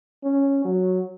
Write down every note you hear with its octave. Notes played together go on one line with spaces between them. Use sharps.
C#4
F#3